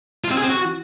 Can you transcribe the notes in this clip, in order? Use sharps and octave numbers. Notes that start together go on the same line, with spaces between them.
F4
C4
G#4
C4
F#4